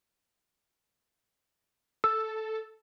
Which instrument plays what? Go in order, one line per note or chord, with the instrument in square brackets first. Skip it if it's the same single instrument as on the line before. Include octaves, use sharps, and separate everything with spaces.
[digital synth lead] A4 [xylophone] E6